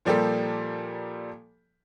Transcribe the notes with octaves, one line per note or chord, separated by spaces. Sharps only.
A#2 F3 G3 A#3 G4 A4